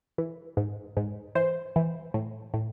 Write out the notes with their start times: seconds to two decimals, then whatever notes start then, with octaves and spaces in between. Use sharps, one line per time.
0.18 E3
0.57 G#2
0.97 G#2
1.35 E3 C5
1.76 E3
2.14 A2
2.54 A2